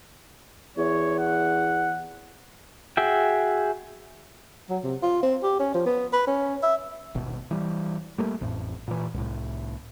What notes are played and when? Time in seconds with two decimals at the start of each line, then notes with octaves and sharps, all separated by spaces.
0.77 E2 C#5
1.20 F#5
2.97 F#4 G#4 E5 G5
4.70 F#3
4.84 C3
5.02 F4
5.23 C4
5.43 G4
5.59 C#4
5.74 F3
5.86 B3
6.13 B4
6.27 C#4
6.63 E5
7.15 D#1 G#1 B2
7.51 E3 G3
8.18 G3 A3 A#3
8.41 A1 F2 A2
8.88 A#2 E3
9.14 C2 A2